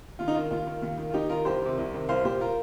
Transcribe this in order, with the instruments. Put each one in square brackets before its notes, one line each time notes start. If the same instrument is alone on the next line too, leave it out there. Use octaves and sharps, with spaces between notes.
[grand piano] D#2 F4
D#4
D#3 F4
D#2 F4
D#3
D#2
D#3
F4
D#2 D#4 G4
D#3 F4 A#4
C2 G4 C5
C3 D#3
C2
C3 D#3
C2 C5 F5
A#2 G4 C5
F4 A#4